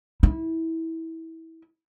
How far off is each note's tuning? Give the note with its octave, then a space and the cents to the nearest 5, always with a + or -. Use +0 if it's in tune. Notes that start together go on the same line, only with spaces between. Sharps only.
E4 -20